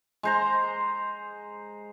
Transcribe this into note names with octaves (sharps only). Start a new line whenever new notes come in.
G#3 C5 A#5